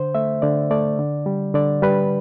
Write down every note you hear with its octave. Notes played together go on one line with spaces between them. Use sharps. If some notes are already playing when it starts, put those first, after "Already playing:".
Already playing: D3 C5
A3 E5
D3 D5
A3 D5
D3
G3
D3 D5
G3 B4